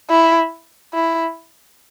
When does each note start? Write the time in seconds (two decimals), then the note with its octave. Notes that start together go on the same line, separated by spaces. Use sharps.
0.10 E4
0.94 E4